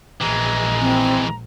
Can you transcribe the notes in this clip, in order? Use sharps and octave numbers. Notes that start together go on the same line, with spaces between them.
A#1 E3 G#3 A#5
C4